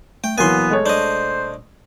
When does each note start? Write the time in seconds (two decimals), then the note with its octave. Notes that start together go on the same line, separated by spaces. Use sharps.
0.24 A3 G5
0.38 D#1 E3 F#3 A#3 B3 G#5 C6
0.70 G#3 A3 C#5
0.86 D4 C5 D#5